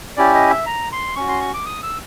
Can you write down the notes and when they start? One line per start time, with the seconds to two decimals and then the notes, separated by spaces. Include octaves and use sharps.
0.17 C#4 E4 G4 D5
0.34 D#5
0.50 E5
0.66 A#5
0.92 C6
1.16 C#4 F#4 C#6
1.28 C6
1.41 C#6
1.54 D6
1.66 D#6
1.83 E6